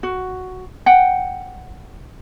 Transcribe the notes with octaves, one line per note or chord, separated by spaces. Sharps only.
F#4
F#5 G5